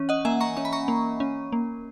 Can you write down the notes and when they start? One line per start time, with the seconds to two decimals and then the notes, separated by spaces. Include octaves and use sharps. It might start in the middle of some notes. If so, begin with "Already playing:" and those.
Already playing: E3 C#4
0.09 D#5 F#5
0.25 A#3 E5 G#5
0.41 A#5 C#6
0.57 C#4 C#6
0.65 B5
0.73 A#5 C#6
0.88 A#3
1.20 C#4
1.52 A#3